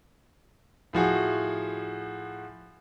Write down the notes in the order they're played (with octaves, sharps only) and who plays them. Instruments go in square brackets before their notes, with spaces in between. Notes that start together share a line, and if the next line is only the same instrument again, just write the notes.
[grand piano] A2 F3 F#4 G#4